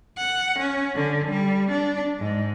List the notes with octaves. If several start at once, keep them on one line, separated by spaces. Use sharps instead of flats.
F#5
C#4
D3
G3
D4
G#2